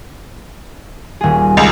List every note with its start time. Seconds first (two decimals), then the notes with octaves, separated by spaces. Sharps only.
1.21 D#1 G#4
1.57 C#2